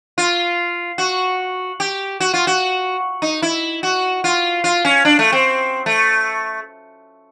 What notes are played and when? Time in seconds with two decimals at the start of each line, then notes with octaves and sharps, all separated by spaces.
0.18 F4
0.98 F#4
1.80 G4
2.20 F#4
2.34 F4
2.47 F#4
3.22 D#4
3.42 E4
3.83 F#4
4.24 F4
4.64 F4
4.85 C#4
5.05 D4
5.19 A3
5.32 C4
5.86 A3